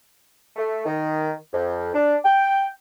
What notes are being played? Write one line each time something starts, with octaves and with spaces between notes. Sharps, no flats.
A3
D#3
F2
D4
G5